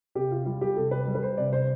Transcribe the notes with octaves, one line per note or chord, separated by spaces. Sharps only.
C3 G4
F4
G3 F4
G4
C3 A4
B4
G3
B4
C5
C3 D5
C5